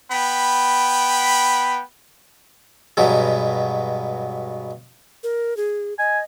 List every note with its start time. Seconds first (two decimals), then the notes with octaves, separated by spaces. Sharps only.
0.11 B3 G5 B5
2.97 G2 B2 F#3 G#3
5.23 A#4
5.57 G#4
5.99 D#5 G#5